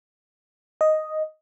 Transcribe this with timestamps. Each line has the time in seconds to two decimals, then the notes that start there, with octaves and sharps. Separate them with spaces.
0.81 D#5